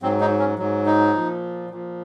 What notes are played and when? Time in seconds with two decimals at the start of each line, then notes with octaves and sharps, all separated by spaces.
0.02 G#2 F#3 C4
0.21 D#4
0.39 C#4
0.58 G#2 F#3
0.86 D#4
1.14 A#2 F3
1.70 A#2 F3